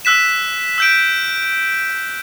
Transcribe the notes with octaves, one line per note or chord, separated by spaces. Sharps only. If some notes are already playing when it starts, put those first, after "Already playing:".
E6 F#6 B6 E7
E6 G6 D7